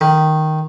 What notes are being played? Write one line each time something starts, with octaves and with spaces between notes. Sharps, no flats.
D#3